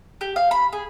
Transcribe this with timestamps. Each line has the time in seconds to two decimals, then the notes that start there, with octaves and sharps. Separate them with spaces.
0.21 G4
0.36 F5
0.51 B5
0.73 G#4